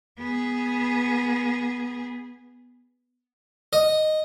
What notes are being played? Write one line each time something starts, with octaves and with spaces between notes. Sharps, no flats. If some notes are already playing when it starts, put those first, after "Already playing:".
B3 G#4
D#5